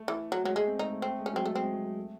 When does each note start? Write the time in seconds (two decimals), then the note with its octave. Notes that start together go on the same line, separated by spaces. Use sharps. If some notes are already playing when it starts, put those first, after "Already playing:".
Already playing: A3
0.08 E3
0.32 F#3
0.44 F#3 G#3
0.56 G#3 A3
0.67 C4
0.79 A3 D#4
0.90 A3
1.02 A3 C4
1.19 G#3
1.26 C#4
1.33 F#3 C4
1.46 G#3 A3
1.55 C4
1.62 G#3
1.73 F#3
1.85 F#3
1.97 A3